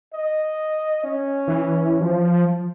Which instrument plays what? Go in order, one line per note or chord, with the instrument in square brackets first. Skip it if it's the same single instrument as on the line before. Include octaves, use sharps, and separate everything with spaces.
[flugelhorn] D#5
C#4
[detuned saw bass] E3
F3